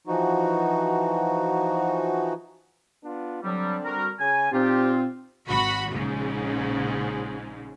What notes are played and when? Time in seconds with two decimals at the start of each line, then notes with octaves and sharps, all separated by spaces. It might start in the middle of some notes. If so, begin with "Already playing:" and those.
0.07 E3 F3 D#4 F#4
3.04 B3 D4 F4
3.43 D3 F#3 G3 C4 D4
3.85 G3 F#4 A#4
4.20 C#3 G#5
4.53 A#2 C4 D#4 F4 G4
5.47 G#1 F#4 B5
5.93 A#1 G#2 C#3